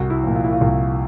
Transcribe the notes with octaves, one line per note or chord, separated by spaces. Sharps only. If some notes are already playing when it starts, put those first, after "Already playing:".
Already playing: C2 F#4
E4
A#2 F3
F4
E4
F4
C2